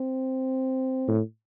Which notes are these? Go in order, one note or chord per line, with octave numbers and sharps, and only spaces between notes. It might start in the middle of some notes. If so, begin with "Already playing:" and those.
Already playing: C4
A2